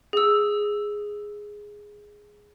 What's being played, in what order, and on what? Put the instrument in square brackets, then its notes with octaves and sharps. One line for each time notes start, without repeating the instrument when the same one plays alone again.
[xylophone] G#4 E6